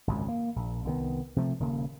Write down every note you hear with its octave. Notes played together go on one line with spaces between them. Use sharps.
G#1 C#2 F#2
A#3
A#1
C2 D#3 B3
C3 F3 A3
D#1 C#3 A#3